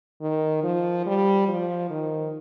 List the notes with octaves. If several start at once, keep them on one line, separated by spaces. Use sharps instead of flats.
D#3
F3
G3
F3
D#3